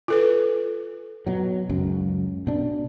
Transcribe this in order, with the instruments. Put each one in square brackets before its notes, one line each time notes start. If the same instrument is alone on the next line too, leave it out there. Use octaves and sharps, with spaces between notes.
[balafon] F4 A4 B4
[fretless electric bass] B2 F#3
C#2 F#2
B2 D4